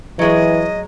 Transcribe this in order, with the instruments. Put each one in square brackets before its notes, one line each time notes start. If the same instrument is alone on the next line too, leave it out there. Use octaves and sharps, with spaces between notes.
[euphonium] E3 [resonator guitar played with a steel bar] F#3 G#3 [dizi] D#5